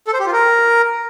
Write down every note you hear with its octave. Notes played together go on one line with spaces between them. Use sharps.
A4
C5
G4
F4
A#4